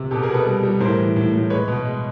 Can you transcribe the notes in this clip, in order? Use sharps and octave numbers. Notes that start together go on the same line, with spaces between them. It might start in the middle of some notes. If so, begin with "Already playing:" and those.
Already playing: C3
B2 G4 A4
G#4 A#4
B2 A4 B4
G3
G3
A2 A#4 C5
E3
A2
A2
G#3 B4 C#5
B2
G#3